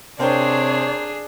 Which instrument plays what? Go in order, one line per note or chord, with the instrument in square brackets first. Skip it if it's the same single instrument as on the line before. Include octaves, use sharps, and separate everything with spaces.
[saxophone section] C3 [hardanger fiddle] D4 G#4 [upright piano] A#4 C5 G5 [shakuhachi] C#5